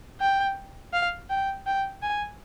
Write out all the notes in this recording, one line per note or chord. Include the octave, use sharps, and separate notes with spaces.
G5
F5
G5
G5
G#5